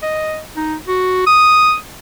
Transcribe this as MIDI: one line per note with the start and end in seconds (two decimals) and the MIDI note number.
0.02 0.41 75
0.57 0.75 63
0.88 1.25 66
1.27 1.75 87